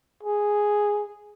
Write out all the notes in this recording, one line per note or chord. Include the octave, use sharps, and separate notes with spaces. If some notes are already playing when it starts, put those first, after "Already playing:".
G#4